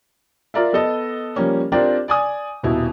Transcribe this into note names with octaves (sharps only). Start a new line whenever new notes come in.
F4 A#4 D5 E5
B3 A4 D#5
F3 G3 A#3 C#4
C4 D4 F4 G4 A#4 D5
D5 G#5 D#6
D#1 B2 E4